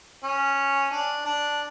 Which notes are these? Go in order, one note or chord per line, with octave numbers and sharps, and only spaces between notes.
C#4
D4
D4